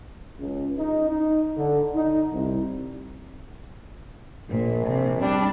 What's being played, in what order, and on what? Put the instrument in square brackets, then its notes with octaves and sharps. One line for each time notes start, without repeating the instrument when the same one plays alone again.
[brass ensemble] C#2
D#4
D#4
D3
D#4
C2
[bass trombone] A#1 [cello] A#2
[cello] C3
[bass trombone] G3 [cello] D4